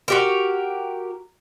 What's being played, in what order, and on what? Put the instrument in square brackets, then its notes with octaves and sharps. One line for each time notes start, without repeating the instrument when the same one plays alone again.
[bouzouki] F#4 G4 A#4